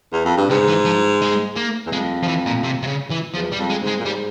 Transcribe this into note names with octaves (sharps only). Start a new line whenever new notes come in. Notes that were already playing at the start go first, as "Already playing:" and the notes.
E2
F2
G2
G#2 C#3
E3
F3
G#3
A#3
E2
F2 G#3
F3
E3
A#2
C3
C3
C#3
E3
E2 F3
G3
F2
G#3
G#2
G#3
A#2
G#2 G3